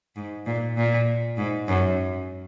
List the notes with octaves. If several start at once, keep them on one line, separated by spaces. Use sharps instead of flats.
G#2
A#2
A#2
G#2
F#2